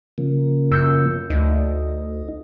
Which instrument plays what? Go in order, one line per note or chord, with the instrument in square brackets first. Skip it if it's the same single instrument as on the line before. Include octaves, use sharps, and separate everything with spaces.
[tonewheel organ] C#3 F3 A#3
[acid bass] F#2 [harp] E6 G6 C#7
[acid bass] D2 [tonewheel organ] D#4